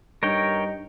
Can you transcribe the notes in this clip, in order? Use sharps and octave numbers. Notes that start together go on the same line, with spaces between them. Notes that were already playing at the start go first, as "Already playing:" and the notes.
G2 D#4 A#4 C#5 G5